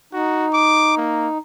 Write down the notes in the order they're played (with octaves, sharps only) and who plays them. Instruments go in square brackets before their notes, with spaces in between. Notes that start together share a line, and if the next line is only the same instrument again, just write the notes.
[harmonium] D#4 [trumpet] F#4
[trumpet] D6
A#3